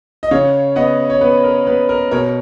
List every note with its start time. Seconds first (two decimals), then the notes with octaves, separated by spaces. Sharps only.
0.23 D#5
0.31 C#3 C#5 F5
0.76 B3 D#5 F#5
1.10 C#5
1.21 B3 B4
1.43 A#4
1.67 B3 B4
1.89 A#4
2.11 B2 A#4 C#5